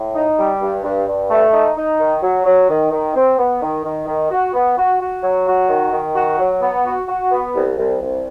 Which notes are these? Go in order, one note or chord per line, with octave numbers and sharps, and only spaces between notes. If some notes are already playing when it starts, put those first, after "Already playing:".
Already playing: A2
D#4
G3
G2
G2
G2
A3
D#4
D#4
D#3
F#3
F#3
D#3
D#3
C4
B3
D#3
D#3
D#3
F#4
B3
F#4
F#4
F#3
F#4
D#3
D#3
F#4
F#3
B3
F#4
F#4
B3
C2
C2
C2